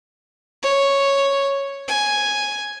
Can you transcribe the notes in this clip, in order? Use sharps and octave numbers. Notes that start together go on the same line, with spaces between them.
C#5
G#5